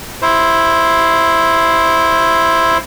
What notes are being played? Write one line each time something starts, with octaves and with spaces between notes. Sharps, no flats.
E4 C5